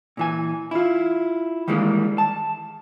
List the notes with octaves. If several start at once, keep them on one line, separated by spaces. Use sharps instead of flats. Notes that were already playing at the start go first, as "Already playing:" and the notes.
A#2 E3 G#5
E4 F4
D#3 E3 G3 G#3 A#3 D#4
A5